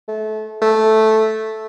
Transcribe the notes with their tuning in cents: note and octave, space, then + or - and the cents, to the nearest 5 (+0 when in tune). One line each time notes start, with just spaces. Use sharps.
A3 -30
A3 -5